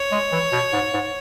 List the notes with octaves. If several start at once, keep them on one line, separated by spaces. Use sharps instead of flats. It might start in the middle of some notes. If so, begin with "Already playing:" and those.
Already playing: C#5
G#3
E3
B2
G#2
G#2